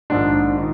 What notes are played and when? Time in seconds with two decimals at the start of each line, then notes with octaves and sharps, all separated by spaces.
0.10 A#1 G#2 D#3 D4
0.58 D#3